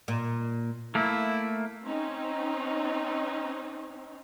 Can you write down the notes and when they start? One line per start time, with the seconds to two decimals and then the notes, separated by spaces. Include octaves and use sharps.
0.08 A#2
0.95 A3 A#3 E4
1.84 C4 C#4 D#4